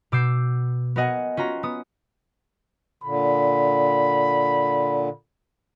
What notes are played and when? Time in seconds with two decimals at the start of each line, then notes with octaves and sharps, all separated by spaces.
0.12 B2 D6 E6 G6 C7
0.96 B3 F#4 A#4 D#5 F#5 G#5
1.37 C#4 F4 F#4 A#5
1.63 B3 D#6
3.03 A#2 D3 B5